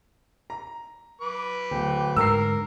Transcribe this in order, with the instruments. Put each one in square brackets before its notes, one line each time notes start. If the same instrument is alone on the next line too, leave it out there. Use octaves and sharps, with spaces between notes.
[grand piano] A#5
[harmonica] B4 D6
[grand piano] D1 [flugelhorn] G5
[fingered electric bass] G#2 D3 [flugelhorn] A#4 [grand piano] E6 C7